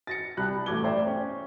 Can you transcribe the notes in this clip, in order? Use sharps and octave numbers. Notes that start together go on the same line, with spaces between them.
A6 A#6 C#7
C2 A5 B5 F#6
A1 A3 D6 G#6 G7
C5 D5 E5 G5
C#4